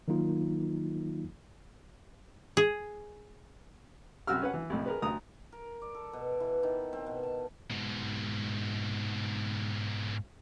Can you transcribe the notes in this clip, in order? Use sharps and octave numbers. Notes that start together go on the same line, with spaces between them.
D#3 F#3 A#3 D#4 F4
G#4
C2 F#3 F#4 E6 F6
C#4 B4 F#5
E3
C2 F2 A2
G#4 A#4 B4
D2 A#5 D#6
A#4
D5
A4
B2
E3
D#3
C4
B2
A5
G#2 B2